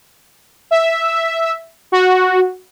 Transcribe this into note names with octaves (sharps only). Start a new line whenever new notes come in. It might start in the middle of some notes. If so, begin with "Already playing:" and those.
E5
F#4